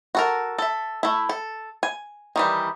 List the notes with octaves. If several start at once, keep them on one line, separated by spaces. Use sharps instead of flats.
F#4 A4 A#4
A4 E5
A3 E4
A4
G#5
D#3 E3 G3